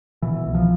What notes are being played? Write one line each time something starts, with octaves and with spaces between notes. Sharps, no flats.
B2 E3
C2
F3